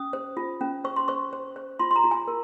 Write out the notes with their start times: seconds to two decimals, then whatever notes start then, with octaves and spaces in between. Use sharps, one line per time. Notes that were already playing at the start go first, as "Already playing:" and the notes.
Already playing: C#4 D#6
0.13 C5
0.37 F4
0.61 C#4
0.84 C5 C#6
0.96 C6
1.08 C5 C#6
1.33 C5
1.56 C5
1.79 F4 C6
1.91 C6
1.96 A#5
2.04 F4
2.11 G#5
2.28 A#4